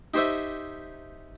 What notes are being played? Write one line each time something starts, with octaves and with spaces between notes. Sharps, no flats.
D#4 G4 C5 C#5 D#5 E5